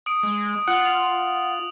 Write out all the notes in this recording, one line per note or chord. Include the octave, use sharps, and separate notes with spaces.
D#6 D7
G#3
F4 F#5 F#7
F7